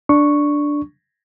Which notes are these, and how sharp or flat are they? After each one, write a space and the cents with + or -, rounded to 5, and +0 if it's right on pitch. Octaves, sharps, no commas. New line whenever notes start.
D4 +0 C#6 +0